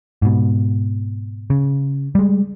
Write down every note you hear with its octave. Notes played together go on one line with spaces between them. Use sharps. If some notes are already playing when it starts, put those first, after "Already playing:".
G#2 B2
C#3
G3 G#3